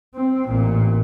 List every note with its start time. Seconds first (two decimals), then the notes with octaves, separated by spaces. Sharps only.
0.15 C4
0.48 A1 A#2